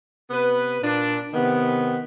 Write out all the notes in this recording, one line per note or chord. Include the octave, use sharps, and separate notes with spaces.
C3 B3 B4
A#2 D4
C3 D#3 B3